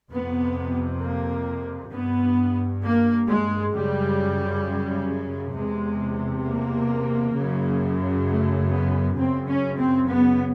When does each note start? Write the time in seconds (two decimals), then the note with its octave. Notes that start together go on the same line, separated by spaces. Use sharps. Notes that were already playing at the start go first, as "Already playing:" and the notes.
0.12 F2 C3 B3
1.02 A#3
1.93 G2 B3
2.84 A#3
3.29 G#3
3.74 F#2 C#3 G3
5.55 E2 C3 G#3
6.46 A#3
7.36 F#2 C#3
8.27 A3
8.73 B3
9.18 F#2 C#3 C4
9.48 C#4
9.78 C4
10.08 B3